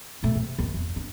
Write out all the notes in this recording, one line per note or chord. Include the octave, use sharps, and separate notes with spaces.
B2 A3
C3
D#2
E2
D4